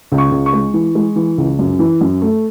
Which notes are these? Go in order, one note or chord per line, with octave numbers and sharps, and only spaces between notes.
C#2
C#6
C#2
C#6
G#3
E3
G#3
E3
C#2
F#2
E3
F#2
A3